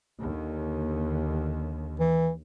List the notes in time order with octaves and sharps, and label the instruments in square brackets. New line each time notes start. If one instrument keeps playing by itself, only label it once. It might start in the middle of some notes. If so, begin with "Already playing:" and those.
[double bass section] D#2 D3
[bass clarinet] E3